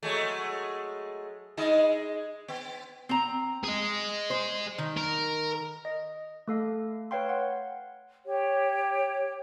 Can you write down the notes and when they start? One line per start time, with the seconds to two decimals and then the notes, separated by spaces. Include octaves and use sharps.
0.03 F#3 G#3 A3
1.57 G#3 D#4 D#5
2.48 B3
3.09 C4 A#5
3.64 G#4 D#5
4.30 C5
4.78 D#3
4.97 A#4
5.85 D#5
6.48 A3 A4 F5
7.11 B4 C#5 F5 G5 C6
7.29 F#5
8.26 G4 C#5